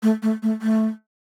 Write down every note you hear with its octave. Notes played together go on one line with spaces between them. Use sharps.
A3
A3
A3
A3